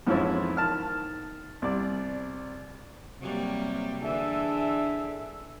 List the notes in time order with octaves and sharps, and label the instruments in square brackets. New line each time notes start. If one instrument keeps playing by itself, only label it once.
[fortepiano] F2 G#2 E3 F3 C#4 E4
D#3 A5 F6
C2 D5
[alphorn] C3 [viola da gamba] F#3 G3 A#3
[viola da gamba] D3 E3 [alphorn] D4 [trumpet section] G#4 A4 E5